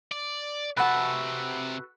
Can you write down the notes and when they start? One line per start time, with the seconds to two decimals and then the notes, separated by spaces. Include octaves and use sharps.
0.12 D5
0.77 C3 F#4 A4 B4 F#5 A5 B5